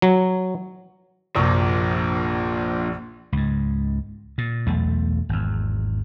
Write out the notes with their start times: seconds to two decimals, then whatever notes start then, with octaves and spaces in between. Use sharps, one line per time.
0.02 F#3
1.36 A#1 F#2 C3 F3 A#3 C#6
3.32 C#2 G#2
4.38 A#2
4.67 B1 E2 A3
5.29 G#1 E2